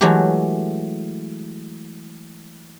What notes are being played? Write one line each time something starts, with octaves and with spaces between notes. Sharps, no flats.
E3 F#3 G#3 A3 G4